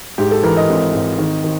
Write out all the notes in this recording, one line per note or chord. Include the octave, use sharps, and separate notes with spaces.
G#2 G4
A4
E3 A#4
D#5
G#1
G#1
D#3
D#3